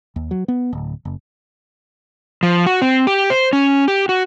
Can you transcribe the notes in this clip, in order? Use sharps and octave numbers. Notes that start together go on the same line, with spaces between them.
D#2
F#3
B3
D1
F#1
F3
F#4
C4
G4
C5
C#4
G4
F#4